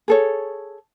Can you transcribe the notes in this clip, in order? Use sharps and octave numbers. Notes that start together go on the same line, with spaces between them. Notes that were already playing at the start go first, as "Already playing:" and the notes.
G#4 A4 C#5